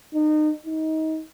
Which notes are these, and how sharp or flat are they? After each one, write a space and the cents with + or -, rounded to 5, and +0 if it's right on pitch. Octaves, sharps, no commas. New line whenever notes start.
D#4 -30
D#4 +25